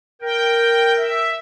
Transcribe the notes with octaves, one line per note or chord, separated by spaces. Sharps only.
A#4 G5
E5